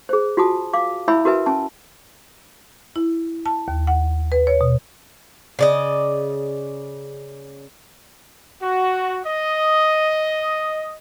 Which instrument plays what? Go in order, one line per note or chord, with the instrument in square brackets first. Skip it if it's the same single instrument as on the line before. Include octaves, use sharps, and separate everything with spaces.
[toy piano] G#4 C5
F4 F#4 G#5 A5 D#6
F5 D6
E4 C#5 E5 G#5 B5 E6
F#4 A#4 B4 E5 G#5
C#4 G#5 A5
[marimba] E4
A5
D#2
F#5
B4
C#5
B2
[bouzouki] C#3 D5 D#5
[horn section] F#4
D#5